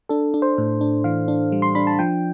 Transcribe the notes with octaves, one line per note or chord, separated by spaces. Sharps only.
D4 A4
D4
C5
A2
D4
E3 F5
D4
G3
C6
D4 B5
A5
F3 G5